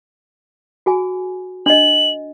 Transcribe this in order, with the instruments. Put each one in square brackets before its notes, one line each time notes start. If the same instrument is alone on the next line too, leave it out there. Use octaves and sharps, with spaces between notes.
[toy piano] F#4 G#4 G#5
[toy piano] D4 D#5 [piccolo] F#7